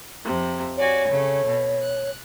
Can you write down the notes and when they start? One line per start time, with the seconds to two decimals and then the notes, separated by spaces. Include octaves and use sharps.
0.24 F2 C3
0.77 F#4 C#5 D5 G#5
1.08 C#3 A3
1.46 B2
1.81 F#6